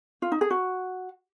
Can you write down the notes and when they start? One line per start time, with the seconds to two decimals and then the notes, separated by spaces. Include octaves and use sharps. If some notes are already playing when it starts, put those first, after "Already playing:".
0.22 F4
0.32 D#4
0.41 G#4
0.50 F#4